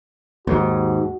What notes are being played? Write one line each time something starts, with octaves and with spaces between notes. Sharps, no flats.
D#2 G#2 F#4